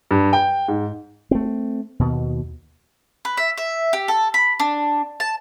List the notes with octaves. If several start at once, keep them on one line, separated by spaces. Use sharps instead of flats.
G2
G5
G#2
A3 C4
D#2 B2
B4
E5
E5
G4
A4
B5
D4
A5